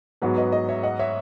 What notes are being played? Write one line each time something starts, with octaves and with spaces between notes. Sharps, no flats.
G#2 F#3 B3 F#4 G#4 B4
B4 D#5
B4 D#5
C#5 E5
D#5 F#5
C#5 E5